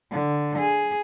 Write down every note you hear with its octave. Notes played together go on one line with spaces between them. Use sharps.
D3
G#4